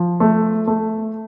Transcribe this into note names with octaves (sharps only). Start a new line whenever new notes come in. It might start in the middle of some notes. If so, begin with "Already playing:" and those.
Already playing: F3
A3
A3